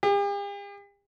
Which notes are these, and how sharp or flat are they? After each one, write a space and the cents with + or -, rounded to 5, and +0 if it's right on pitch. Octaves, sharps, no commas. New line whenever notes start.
G4 +45